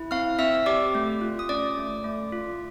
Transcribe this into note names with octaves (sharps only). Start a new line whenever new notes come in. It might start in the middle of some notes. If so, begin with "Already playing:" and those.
Already playing: E4
C4 F5 F6
C4 E5 E6
G4 D5 D6
A3
F4
D#6
C#4 D5 D6
A3
A3
F4